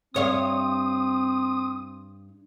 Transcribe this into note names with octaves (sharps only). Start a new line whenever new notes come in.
G2 C4 C#5 F5 D#6